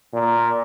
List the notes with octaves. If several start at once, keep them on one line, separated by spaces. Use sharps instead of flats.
A#2